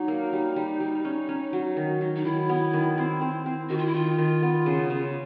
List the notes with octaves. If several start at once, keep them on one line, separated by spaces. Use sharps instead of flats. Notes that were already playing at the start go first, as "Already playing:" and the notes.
Already playing: F#3 D4 D#4
A#3
G3
G3
G3
C#4
C#4
F#3
D#3
F#3
D#4
D#3 E4
B3
D#3
C4
C4
C4
D#3 F#4
F4
E4
D#3 F4
D#3
B3
C#3
C#3